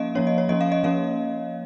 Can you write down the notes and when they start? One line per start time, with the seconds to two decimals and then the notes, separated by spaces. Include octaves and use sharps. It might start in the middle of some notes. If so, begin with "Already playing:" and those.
Already playing: F3 A#3 C#4 D#5 F5
0.15 F3 A#3 C#4 C#5
0.27 D#5
0.38 C#5
0.49 F3 A#3 C#4 D#5
0.61 F5
0.72 D#5
0.83 F3 A#3 C#4 F5